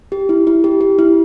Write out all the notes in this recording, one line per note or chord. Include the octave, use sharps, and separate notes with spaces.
G4
E4
E4
G4
G4
E4